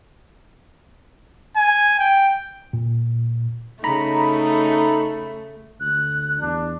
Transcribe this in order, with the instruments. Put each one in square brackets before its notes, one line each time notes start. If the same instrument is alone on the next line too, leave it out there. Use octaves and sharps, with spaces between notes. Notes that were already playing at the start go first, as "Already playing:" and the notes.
[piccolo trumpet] G#5
G5
[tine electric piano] A#2
[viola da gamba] C#3 [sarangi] A3 [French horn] D#4 [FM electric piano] A#5 B5
[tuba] D2 [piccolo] F#6
[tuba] E2 [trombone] D4